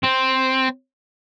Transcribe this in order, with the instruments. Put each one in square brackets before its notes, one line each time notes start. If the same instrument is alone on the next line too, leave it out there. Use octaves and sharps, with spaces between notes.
[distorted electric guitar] C4